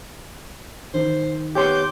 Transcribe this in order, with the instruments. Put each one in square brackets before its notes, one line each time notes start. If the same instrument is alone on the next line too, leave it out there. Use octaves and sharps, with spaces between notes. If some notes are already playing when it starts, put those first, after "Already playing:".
[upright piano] D#3 [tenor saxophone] C5
[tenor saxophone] B3 [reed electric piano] G4 C#5 C6 [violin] D6 G6